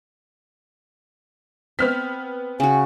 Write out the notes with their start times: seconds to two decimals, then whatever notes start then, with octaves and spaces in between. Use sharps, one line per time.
1.79 B3 C4 F6 B6
2.60 C#3 F#4 G#5